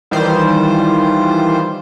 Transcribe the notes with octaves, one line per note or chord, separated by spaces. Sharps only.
D#3 E3 G3 F4 C5